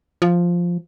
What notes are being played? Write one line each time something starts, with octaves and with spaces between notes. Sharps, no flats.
F3